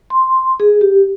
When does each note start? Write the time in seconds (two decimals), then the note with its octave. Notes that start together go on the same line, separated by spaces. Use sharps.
0.10 C6
0.60 G#4
0.81 G4